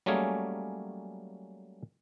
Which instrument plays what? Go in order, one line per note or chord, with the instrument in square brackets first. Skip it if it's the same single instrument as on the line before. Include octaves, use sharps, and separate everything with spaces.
[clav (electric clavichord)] F#3 G3 A3 A#3 C#4 G#4